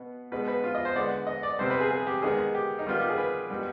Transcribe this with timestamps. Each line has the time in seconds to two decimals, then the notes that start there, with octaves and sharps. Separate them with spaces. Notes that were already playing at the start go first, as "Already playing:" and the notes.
Already playing: B2 B3
0.32 B2 G#3 B3 B4
0.48 B4
0.64 F4
0.75 D#5
0.85 C5
0.95 D3 G#3 B3 D5
1.27 D#5
1.43 D5
1.59 C3 G3 B3 C5
1.70 B4
1.80 G#4
1.91 G#4
2.07 G4
2.22 D#3 G#3 B3 G#4
2.55 G4
2.79 D#4
2.86 D#3 G3 B3 F4
2.99 G4
3.09 G#4
3.18 B4
3.50 B2 G3 B3